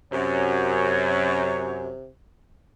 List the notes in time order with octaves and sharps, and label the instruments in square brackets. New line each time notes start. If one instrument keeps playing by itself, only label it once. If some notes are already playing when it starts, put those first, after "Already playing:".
[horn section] F#2 [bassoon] C3 [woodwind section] C#5